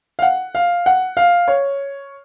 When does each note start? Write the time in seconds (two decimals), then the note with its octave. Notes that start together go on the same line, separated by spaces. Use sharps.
0.19 F5
0.22 F#5
0.55 F5
0.86 F#5
1.17 F5
1.48 C#5